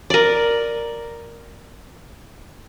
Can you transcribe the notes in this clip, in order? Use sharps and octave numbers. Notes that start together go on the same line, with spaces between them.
A#4 D5